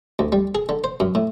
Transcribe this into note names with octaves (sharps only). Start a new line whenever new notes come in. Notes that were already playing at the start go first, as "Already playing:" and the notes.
D2
G3
G#4
D3
C5
F#2
A2